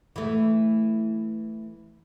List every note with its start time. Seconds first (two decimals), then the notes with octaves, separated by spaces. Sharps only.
0.16 E3 A3